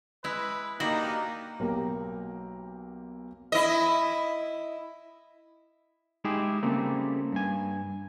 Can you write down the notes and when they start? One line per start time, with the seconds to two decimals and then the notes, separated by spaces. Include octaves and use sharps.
0.24 G#3 E4 B4
0.80 A#3 D4 D#4 F#4 G4
1.59 B1 A#3 G4 A#5
3.52 E4 D#5
6.25 G#3 D#4 E4 G4 G#4
6.63 C#3 G3 A3 A#3 C4
7.32 G2 G#5